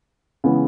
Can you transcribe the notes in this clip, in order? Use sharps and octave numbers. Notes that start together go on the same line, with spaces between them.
C#3 E3 G#3 B3